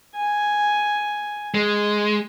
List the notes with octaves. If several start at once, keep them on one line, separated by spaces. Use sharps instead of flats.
G#5
G#3